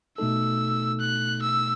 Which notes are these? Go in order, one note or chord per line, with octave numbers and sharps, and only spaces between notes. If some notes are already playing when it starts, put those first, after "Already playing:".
B2 A3 D#4 A4 E6
F#6
E6